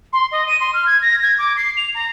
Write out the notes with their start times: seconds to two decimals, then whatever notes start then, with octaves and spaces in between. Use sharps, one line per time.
0.13 C6
0.32 D#5
0.47 D#7
0.60 C6
0.74 F6
0.86 G#6
1.02 A#6
1.23 G#6
1.38 D6
1.57 C7
1.77 F7
1.95 A#5